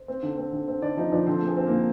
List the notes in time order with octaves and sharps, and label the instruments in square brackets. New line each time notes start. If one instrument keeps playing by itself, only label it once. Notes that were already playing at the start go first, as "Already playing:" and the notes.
Already playing: [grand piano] C5
C4
D3
C4
D3
C4
D3 D4 D5
F3 D#4 D#5
F3 D4 D5
D3 C4 C5
G#3 G#4
C4
D3 A#3 A#4